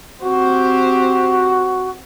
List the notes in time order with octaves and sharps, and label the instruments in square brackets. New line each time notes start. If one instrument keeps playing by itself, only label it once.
[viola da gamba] C4 G4 C5 [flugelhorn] F#4